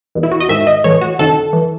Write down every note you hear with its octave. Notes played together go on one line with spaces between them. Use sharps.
E2 B2
E4
F#4
D#5
G#2 D#3 E5
D#5
A2 E3 C#5
F#4
F#2 D#3 A4
E3